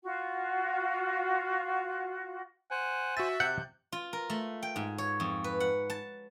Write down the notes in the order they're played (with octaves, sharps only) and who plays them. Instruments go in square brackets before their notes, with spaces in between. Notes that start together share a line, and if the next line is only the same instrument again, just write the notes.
[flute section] F4 F#4
[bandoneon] C5 G#5 [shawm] F#5
[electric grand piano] F#4 A6 [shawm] E5
[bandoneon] C3 [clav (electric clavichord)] F#5 [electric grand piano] F#6 G6
[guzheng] F4
A#4
A3
G5
G#2
C#5
F2
B4
F#5
A5